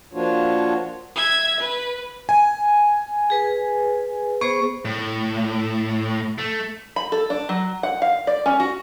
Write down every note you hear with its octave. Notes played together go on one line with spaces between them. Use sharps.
F3 A#3 D4 F4 F#4 C#5
E5 G#6
B4
G#5
G#4 B4
B3 G#4 C5 C#6
A2
A3
B5
A4
D4
F#3
F#5
F5
D5
C#4
F#4